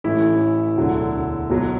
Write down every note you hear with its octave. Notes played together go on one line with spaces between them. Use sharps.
A1 A2 E3 E4
E1 D2 D3 F#3
B1 B2 F#3